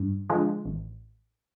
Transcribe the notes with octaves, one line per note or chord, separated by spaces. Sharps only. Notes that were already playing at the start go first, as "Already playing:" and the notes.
Already playing: G2
D3 F3 G#3
A1